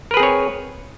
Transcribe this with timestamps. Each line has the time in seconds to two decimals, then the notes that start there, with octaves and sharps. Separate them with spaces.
0.11 A#4
0.14 B4
0.17 G#4
0.20 C4
0.23 C#5